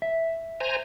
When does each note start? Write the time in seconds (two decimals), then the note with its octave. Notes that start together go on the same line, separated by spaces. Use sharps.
0.02 E5
0.60 C5 G#5 A#5